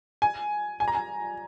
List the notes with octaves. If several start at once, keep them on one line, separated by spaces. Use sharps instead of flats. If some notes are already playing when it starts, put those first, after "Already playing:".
G#5
G#5
A#5
G#5